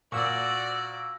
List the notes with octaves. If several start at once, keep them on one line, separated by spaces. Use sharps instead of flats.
A#2 F#4 D5 C#6 E6 A#6